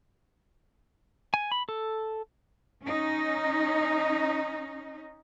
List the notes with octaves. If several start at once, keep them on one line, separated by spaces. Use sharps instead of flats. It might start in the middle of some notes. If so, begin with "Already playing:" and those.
G#5
B5
A4
C#4 D#4